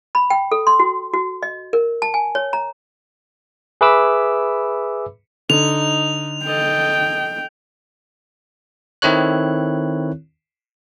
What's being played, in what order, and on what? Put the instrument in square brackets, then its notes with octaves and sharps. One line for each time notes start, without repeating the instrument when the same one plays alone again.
[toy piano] B5
G5
A4
C6
F#4
F#4
D#5
A#4
A5
G#5
C#5
A#5
[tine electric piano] G#4 B4 E5 B5 D6 E6
[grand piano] D3 [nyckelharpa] D#4 [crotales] F7
[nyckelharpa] A4 D#5 [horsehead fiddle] G5
[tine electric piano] D#3 C4 E4 A4 C#5 F#6